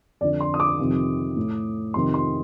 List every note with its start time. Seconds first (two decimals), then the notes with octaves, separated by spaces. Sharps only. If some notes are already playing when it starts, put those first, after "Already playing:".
0.21 F2 D3 D5
0.41 C6
0.54 D#6
0.60 D6
0.79 F2 C3 D#3
1.37 A2
1.94 F2 C3 D#3 C6
2.14 C6